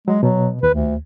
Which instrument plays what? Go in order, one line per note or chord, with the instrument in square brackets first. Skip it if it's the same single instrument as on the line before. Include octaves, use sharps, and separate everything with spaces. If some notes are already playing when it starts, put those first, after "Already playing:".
[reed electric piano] F#3 [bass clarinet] G#3
[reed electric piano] B2 [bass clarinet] F#3
[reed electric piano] D#2 [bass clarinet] B4
[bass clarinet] D2